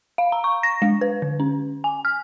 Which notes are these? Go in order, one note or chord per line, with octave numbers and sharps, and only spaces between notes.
F5
A#5
C#6
A#6
G#3
B4
D3
C#4
G#5
F6